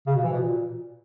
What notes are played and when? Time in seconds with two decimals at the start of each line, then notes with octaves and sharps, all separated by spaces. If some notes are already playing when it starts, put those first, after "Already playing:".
0.06 C#3
0.15 B2
0.24 E3
0.32 B2
0.41 A#2